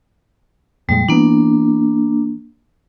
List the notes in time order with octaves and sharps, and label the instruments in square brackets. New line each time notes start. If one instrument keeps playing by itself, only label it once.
[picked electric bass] F2 A#2 G#3 [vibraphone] G3
[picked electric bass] E3 B3 [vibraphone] A#3 D4